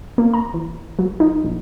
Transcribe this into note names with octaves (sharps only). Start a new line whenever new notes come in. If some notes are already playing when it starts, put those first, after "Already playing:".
A#3
A#5
E3
F#3
D#4
A#1